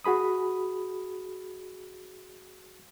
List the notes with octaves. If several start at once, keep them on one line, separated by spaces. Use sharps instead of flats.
F#4 G#4 B5 D#6